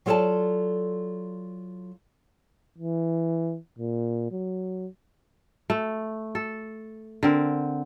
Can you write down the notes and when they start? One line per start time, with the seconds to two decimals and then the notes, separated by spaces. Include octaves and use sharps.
0.06 F#3 F4 A4 C#5 D5 A5
2.78 E3
3.79 A#2
4.32 F#3
5.70 A3
6.35 A4
7.23 D3 C4 A#4